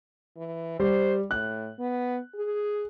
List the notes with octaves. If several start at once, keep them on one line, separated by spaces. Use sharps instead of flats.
E3
G3 C5
A2 F#6
B3
G#4